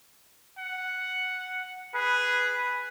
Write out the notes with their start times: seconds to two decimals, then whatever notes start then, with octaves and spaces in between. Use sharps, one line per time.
0.58 F#5
1.94 G#4 B4